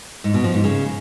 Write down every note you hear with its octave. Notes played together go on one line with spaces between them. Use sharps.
G#2
B2
F3
G#2
C#3